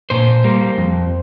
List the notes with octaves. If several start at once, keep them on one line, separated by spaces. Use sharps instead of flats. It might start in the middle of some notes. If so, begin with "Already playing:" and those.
A#2 C5
G3 A#3
F2